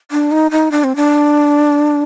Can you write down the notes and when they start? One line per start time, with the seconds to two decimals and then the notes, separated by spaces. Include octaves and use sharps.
0.11 D4
0.31 D#4
0.51 D#4
0.72 D4
0.84 C4
0.96 D4